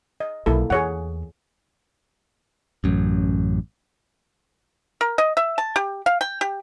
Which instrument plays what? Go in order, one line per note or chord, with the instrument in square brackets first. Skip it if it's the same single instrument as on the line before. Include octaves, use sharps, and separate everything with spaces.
[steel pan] D#5
[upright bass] B1 [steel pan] A#3 E4 A4
[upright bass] E2 [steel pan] G#4 C#5 F#5
[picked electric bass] A1 F#2
[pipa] A#4
D#5
E5
A5
G4
F5
G5
G4